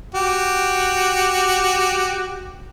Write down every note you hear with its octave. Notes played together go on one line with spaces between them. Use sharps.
F#4 G4